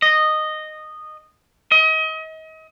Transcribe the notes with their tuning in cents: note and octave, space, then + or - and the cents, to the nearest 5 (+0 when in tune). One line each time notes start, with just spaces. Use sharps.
D#5 -10
D#5 +35